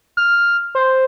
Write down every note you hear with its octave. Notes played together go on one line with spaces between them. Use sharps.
F6
C5